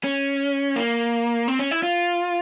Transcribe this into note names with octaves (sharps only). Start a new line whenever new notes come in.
C#4
A#3
C4
C#4
E4
F4